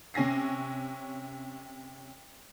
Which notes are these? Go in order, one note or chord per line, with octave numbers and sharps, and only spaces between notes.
C3 C#4 G#5 A#6 C7